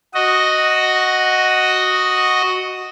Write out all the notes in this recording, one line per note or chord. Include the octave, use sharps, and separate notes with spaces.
F#4 D#5